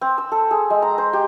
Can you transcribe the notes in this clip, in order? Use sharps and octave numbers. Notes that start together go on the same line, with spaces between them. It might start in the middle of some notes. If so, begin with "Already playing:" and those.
C4
E6
A4
G#4
G#3
A#5
C5
G4